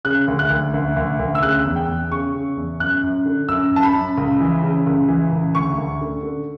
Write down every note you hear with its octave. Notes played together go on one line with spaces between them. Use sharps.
C#3 F#6
D2
F#6
D2
D2
D2
D2
E6
C#3 F#6
E2
G5
E2
C#3 C#6
C#3
E2
F#2 F#6
F#2
D3
F#2 E6
F#2 A5
B5
F#2
C#2
E3
C#3
C#2
E3
C#2
D2 C#6
D2
D3
D3